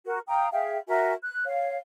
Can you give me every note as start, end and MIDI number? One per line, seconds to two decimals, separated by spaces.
0.05 0.19 66
0.05 0.19 70
0.28 0.48 77
0.28 0.48 79
0.28 0.48 82
0.28 0.48 87
0.52 0.77 68
0.52 0.77 76
0.52 0.77 77
0.52 0.77 79
0.87 1.13 66
0.87 1.13 70
0.87 1.13 76
0.87 1.13 80
1.22 1.45 90
1.45 1.76 73
1.45 1.76 77